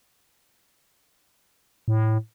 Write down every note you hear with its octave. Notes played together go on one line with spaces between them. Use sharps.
A2